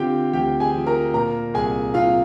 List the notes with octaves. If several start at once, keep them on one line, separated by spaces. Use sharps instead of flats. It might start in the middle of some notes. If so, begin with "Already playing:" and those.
Already playing: D3 C4 F4 G4 F5 G5
D2 G4 G5
G#4 G#5
F3
A#4 A#5
A#2 A#4 A#5
C2 G#4 G#5
C2 F4 F5